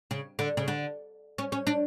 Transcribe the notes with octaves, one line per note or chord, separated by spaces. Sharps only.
C#3
D3
C#3
D3
C#4
C#4
D4